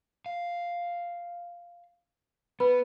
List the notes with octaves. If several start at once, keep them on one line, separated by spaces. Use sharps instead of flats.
F5
B3 B4 B5